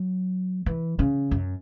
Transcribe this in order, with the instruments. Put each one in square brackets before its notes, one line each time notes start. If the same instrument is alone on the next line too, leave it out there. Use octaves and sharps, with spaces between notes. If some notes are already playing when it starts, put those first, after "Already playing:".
Already playing: [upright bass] F#3
E3
C#3
F#2